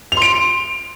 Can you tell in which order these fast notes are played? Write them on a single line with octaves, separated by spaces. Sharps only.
F7 C6 D7